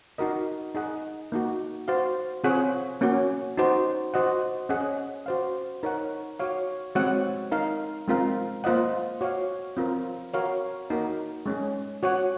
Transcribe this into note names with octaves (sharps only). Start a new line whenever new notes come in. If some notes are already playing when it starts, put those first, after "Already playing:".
D#4 F#4 A#4 D#5
D#4 G#4 D#5 F#5
A#3 D#4 F#4
F#4 C5 F5
C4 F4 G#4 C#5 F#5
A#3 C#4 F#4
D#4 F#4 C5
F#4 C5 D#5 F#5
C#4 G#4 D#5 F#5
F#4 C5 F5
D#4 A#4 C#5 F#5
F#4 C#5 F5
G#3 C4 F#4 C#5 F#5
D#4 A#4 F5
G#3 C4 F4 A#4 F5
A#3 F4 C5 D#5 F#5
F#4 C#5 F5
C4 F4 A#4
F#4 A#4 C#5 F5
A#3 D#4 F#4 A#4
G#3 C#4 G#4
F#4 C#5 F#5